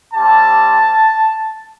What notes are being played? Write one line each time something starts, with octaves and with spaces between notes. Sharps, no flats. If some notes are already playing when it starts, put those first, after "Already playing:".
G3 C4 G4 A5